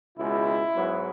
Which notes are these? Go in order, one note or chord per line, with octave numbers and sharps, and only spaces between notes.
C#2 B2 G#3 E4
G#2 F#3 B3